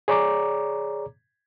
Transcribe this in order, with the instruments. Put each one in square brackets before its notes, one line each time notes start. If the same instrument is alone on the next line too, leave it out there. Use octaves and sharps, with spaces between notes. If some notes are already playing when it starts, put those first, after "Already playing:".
[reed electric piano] G#4 C#5 D5 A#5 D6